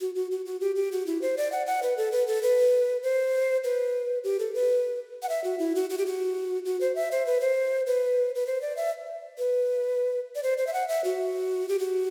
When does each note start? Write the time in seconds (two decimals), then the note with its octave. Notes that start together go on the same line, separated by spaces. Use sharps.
0.01 F#4
0.15 F#4
0.31 F#4
0.46 F#4
0.61 G4
0.76 G4
0.92 F#4
1.07 E4
1.22 C5
1.37 D5
1.52 F#5
1.66 F#5
1.83 B4
1.97 A4
2.12 B4
2.27 A4
2.43 B4
3.03 C5
3.64 B4
4.24 G4
4.39 A4
4.54 B4
5.23 F#5
5.29 E5
5.44 F#4
5.59 E4
5.75 F#4
5.90 F#4
5.98 G4
6.06 F#4
6.65 F#4
6.81 C5
6.95 E5
7.12 C5
7.26 B4
7.41 C5
7.87 B4
8.35 B4
8.47 C5
8.62 D5
8.77 E5
9.38 B4
10.35 D5
10.43 C5
10.58 C5
10.67 E5
10.73 F#5
10.88 E5
11.04 F#4
11.69 G4
11.79 F#4